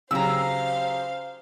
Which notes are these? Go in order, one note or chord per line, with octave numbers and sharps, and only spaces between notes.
C#3 F#3 G4 C5 F5 A#5 E6